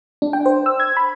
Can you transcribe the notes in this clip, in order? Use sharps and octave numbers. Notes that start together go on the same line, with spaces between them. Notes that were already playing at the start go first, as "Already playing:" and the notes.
D4
G5
C5
E6
G#6
B5